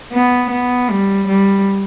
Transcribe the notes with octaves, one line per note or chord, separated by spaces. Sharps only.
B3
B3
G3
G3